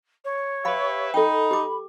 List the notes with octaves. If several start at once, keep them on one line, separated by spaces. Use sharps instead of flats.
C#5
G4 B4 E5 F5 B5
D#4 A4 G5 B5
G4 D6